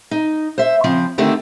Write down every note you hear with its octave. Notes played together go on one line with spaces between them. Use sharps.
D#4
C5 E5
C#3 F3 C4
D3 D#3 A3 C4 G4